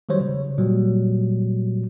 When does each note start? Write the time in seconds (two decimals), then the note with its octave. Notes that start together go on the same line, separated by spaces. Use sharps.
0.09 D#3 F#3 G3 C5 C#5
0.21 C#3
0.58 A#2 F#3 G3